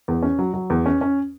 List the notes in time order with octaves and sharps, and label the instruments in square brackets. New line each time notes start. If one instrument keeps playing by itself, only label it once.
[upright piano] E2
C#4
F#3
F#3
E2
C#4
C#4